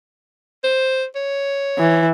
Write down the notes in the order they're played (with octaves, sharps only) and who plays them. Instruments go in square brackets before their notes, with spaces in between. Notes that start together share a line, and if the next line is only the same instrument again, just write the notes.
[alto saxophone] C5
C#5
[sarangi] E3